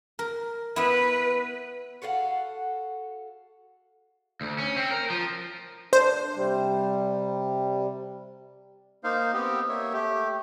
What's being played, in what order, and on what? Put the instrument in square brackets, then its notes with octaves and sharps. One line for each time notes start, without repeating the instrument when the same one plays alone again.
[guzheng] A#4
[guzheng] B3 E4 [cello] B4
[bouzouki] F#4 A4 F5 F#5
[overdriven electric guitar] D2
C#4
C4
A#4
F3
[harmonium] D4 [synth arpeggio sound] C5
[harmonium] C3 G3
[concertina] A#3 D#4 C5 F5
B3 C4 G4
A#3 C#5 E5
A3 G4